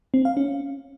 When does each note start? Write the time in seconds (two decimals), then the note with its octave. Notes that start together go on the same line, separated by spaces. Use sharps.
0.14 C4
0.25 F5
0.37 C#4